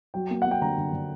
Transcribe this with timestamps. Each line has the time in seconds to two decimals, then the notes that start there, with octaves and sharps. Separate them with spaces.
0.14 F#3 G5
0.30 A#3
0.42 F#5
0.47 A#3 G5
0.62 D3 A#5
0.78 D3
0.93 D3